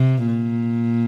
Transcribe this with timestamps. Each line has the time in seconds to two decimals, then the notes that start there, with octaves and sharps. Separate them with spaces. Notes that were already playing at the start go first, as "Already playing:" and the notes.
Already playing: C3
0.26 A#2